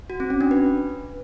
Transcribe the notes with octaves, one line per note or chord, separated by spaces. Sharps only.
F#4
C4
C#4
D4
B4